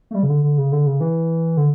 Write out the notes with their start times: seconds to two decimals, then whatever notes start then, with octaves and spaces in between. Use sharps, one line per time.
0.11 A3
0.15 G3
0.23 C#3
0.29 D3
0.44 D3
0.58 C#3
0.72 D3
0.86 C#3
1.00 E3
1.57 D3